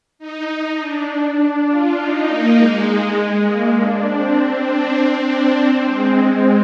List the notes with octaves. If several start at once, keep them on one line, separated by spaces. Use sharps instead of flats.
D#4
D#4
D4
D4
D4
F4
D#4
A#3
G#3
A#3
D4
C4
C4
D4
C4
D4
C4
G#3